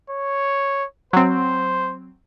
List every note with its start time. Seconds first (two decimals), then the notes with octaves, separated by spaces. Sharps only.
0.10 C#5
1.13 F#3 C4 C5